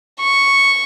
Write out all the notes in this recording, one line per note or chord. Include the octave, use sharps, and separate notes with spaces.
C#6